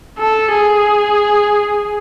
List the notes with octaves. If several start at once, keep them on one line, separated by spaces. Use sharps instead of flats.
A4
G#4